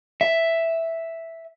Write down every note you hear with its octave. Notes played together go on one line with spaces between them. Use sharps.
E5